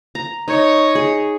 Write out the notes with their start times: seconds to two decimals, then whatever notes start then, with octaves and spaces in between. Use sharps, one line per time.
0.15 A#5
0.48 D#4 C#5 D#5
0.95 G#4